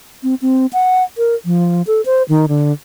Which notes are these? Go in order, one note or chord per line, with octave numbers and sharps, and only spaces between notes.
C4
C4
F#5
A#4
F3
A4
C5
D#3
D3